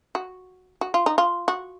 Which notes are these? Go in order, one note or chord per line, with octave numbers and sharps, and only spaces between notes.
F#4
F#4
F4
D#4
F4
F#4